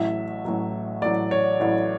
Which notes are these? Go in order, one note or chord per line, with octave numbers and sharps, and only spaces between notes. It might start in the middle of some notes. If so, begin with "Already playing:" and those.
Already playing: A1 A2 F#3 E5
A1 A2 F#3
A1 A2 F#3 D5
C#5
A1 A2 F#3